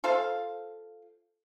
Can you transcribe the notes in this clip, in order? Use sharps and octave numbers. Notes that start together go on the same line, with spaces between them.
F4 A4 C5 F5